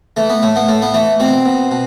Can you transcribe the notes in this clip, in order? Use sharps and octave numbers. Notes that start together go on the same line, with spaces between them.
E3 A3
B3
A2 A3
B3
A2 A3
B3
E3 A3
B2 C4
B2
B2